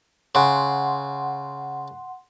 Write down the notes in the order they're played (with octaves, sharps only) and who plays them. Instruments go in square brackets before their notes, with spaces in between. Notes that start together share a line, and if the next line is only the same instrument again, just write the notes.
[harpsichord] C#3 [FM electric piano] F#5 C6